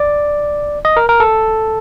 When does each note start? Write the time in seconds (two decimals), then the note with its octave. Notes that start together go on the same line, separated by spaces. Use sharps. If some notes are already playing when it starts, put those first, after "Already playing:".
Already playing: D5
0.85 D#5
0.97 A#4
1.09 A#4
1.20 A4